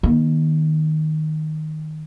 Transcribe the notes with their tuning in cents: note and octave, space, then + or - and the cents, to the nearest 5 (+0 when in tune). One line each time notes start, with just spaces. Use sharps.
D#3 +0 A#3 +45